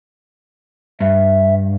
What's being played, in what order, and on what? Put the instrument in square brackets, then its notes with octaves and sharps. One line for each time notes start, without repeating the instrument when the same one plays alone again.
[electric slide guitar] G2 [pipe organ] E5